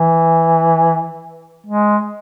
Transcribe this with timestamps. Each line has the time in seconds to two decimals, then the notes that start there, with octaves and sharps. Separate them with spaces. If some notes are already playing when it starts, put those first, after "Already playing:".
Already playing: E3
1.66 G#3